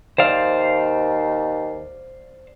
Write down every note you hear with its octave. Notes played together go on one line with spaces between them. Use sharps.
D#2 C5 D5 F5